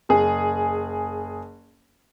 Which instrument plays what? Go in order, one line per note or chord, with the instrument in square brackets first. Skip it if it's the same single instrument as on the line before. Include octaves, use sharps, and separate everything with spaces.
[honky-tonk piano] F#1 G#4